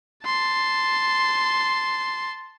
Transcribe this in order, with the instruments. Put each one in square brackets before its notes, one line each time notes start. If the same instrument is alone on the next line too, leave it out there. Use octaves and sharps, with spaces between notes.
[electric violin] A5 C6